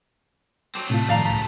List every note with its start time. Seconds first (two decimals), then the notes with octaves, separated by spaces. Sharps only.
0.75 F#3 C4 D6
0.90 F#2 A2 C3 A3 F4
1.09 G2 D#3 F3 D5 F5 A#5
1.25 C#2 A#5 A6 B6